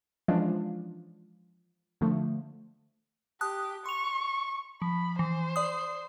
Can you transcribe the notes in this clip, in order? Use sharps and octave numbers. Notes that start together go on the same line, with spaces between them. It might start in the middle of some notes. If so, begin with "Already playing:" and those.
E3 F3 G#3 C#4 D4 F4
D3 F3 A3
G4 A5 D#6 F#6
C6 C#6 F7
F3 B5
E3 C5
D5 D#6